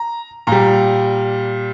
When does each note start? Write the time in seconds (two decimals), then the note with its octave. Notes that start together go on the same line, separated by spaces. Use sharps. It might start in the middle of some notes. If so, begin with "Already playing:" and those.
Already playing: A#5
0.47 A#2 G3 A#5